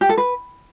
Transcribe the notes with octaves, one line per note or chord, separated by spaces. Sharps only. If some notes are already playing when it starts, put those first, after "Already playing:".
G4
A4
B4